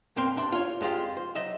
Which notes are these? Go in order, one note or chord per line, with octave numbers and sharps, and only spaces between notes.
B1 F2 C4 A#4 C6
G2 D4 E5 C6
F4 C#5
F2 G#3 D#4 F4 G4
C5
F#3 D#5 E5